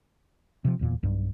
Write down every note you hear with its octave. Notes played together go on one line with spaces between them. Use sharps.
C3 F3
D1 E2 A#2
B1 G2